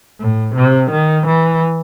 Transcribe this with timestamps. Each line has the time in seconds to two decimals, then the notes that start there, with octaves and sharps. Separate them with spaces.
0.20 A2
0.55 C3
0.91 D#3
1.27 E3